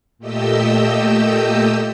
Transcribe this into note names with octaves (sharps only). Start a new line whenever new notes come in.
A#2 A3 G4 D#5 E6 G6